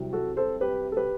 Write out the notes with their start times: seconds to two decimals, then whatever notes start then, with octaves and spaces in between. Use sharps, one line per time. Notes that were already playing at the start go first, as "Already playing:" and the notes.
Already playing: C2 C3 F#3
0.13 F#4 A4
0.37 A4 C5
0.61 G4 B4
0.92 A4
0.97 G4 B4